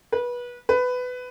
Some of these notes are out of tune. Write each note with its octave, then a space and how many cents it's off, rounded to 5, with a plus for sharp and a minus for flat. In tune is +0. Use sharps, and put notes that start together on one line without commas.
B4 -25
B4 +15